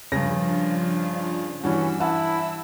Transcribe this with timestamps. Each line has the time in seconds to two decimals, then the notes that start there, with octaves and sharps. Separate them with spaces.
0.12 G2 C#3 F3 D4 F4 A#6
1.63 G2 E3 C#4 F#4 E6
2.00 E4 F#5 A5